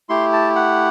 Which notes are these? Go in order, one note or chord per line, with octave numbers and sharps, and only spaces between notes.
A3 E4 G4 C6
A5
F#5